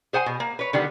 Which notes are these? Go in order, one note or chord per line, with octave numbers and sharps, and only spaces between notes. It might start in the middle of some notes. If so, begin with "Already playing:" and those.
G#4 C5 F#5 G#5
B2
A#3
B4 C#5
D3 D#3 G3 B3